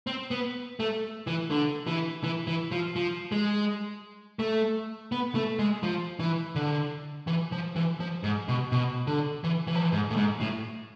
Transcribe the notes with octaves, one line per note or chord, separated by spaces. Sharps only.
C4
B3
A3
E3
D3
E3
E3
E3
F3
F3
G#3
A3
B3
A3
G#3
F3
E3
D3
E3
F3
E3
F3
G#2
B2
B2
D3
E3
E3
F3
E3
G#2
A2
G#2
A2